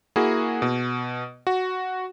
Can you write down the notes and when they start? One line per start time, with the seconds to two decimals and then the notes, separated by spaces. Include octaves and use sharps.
0.16 A#3 E4 F#4 G#4
0.62 B2
1.47 F#4